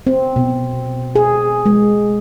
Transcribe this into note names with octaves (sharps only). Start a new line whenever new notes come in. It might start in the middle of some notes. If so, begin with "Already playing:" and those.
C4
B2
G#4
G#3